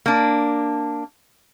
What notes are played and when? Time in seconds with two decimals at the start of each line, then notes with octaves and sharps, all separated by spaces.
0.06 A#3 D4